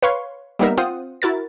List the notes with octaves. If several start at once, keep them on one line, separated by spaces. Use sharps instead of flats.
B4 C#5 F5 C6 C#6
G3 A#3 B3 D#4 A#4 E5
C4 F4 C5 F#5 D#6
E4 F#4 A#4 A6